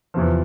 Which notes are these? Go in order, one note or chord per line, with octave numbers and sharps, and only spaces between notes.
E2 C3 F3